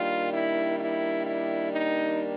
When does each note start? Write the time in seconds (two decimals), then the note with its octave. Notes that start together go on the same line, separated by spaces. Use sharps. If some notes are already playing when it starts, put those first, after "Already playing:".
Already playing: D#3 G3 A#3 D4 F4
0.33 E4
0.80 E4
1.26 E4
1.73 D#4